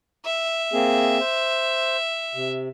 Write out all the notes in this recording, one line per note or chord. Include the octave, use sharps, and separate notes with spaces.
E5
A#3 C4 G#4
C5
C3